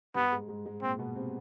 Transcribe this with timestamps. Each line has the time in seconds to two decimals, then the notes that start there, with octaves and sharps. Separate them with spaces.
0.15 G2 G3 B3
0.32 G#2 G#3
0.48 G#2 G#3
0.66 G#2 G#3
0.82 A#2 A#3 C4
0.99 B2 B3
1.15 C3 C4